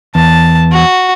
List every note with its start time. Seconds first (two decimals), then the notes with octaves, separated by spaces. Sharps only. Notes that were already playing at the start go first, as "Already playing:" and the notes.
0.15 E2 A5
0.72 F#4